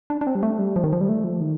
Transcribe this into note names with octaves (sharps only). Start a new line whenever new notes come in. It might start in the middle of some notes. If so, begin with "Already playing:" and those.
D4
D4
C4
G3
A3
G3
F3
D#3
F3
G3
A3
F3
D#3